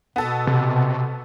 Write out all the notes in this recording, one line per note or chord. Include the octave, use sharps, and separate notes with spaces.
B2 B3 A4
C3